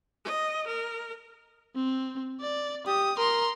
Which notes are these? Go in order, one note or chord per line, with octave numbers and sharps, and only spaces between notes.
D#5
A#4
C4
D5
G4 D#6
A#4 A#5 C6